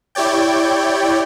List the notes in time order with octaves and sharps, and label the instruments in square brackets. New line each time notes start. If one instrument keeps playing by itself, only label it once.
[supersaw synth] E4 G4 C#5 D5 G5